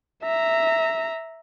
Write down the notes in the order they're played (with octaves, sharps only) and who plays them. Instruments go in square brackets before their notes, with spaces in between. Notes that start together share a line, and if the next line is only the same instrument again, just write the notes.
[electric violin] E5 A#5